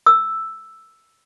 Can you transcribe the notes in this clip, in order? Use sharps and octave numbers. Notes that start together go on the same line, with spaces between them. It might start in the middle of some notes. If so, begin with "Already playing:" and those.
E6